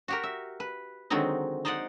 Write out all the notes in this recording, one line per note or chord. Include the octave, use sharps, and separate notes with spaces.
F#4 G4 A#4
E5
B4
D3 D#3 F#3 G#3 C4 D#4
D#4 C5 D5 D#5 F#5